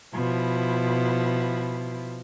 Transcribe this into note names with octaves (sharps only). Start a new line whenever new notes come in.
B2 F3 E4